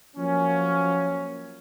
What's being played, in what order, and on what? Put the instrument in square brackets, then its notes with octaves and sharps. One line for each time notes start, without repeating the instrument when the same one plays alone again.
[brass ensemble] F3 F#3 A#3 C#4